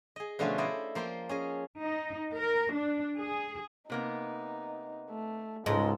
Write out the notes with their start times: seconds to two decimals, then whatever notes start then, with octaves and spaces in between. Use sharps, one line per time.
0.16 G#4 D#5
0.39 B2 D3 F3 A3 C#4 F4
0.58 E4 C5 D5 D#5
0.95 F3 A#3 C5 G5 C6
1.29 C#4 G#4 D#5
1.80 D#4
2.35 A#4
2.74 D4
3.20 G#4
3.90 C3 A#3 B3 D#4
5.10 A3
5.66 C#2 G#2 A4 D#5